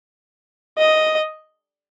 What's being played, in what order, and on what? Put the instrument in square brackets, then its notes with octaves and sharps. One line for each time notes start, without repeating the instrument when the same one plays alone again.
[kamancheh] D#5